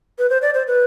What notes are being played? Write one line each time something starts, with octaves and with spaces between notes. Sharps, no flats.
B4
C5
D5
C5
B4